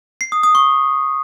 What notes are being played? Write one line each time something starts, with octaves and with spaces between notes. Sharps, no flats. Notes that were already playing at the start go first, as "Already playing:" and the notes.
C7
D#6
D#6
C#6